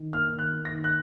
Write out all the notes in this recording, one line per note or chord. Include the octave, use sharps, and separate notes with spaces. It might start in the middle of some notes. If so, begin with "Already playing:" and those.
Already playing: D#3
A#3 F6
D#3
F#6
A#3
A#6
D#3
F#6